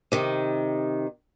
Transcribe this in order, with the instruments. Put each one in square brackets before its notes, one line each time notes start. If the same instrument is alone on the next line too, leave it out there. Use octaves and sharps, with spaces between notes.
[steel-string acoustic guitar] C3 D#3